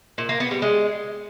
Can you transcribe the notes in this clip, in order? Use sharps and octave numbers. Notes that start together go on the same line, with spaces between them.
A#2
A#3
B3
G3
G#3